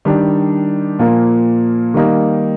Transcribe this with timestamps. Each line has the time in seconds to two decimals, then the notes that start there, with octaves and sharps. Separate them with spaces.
0.05 D#3 G3 D4
0.99 A#2 F3 A#3
1.94 D#3 G3 A#3 D#4